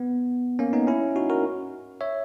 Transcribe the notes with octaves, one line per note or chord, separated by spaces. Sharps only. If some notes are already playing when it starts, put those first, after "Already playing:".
Already playing: B3
A#3 C#4
B3 D#4
C#4 E4
D#4 F#4
F#4 A#4
C#5 E5